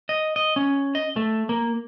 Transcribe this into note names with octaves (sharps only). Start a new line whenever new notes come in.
D#5
D#5
C#4
D#5
A3
A#3